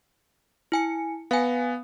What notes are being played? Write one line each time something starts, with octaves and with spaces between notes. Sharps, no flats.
E4 G#5 C#7
B3 F5 G#5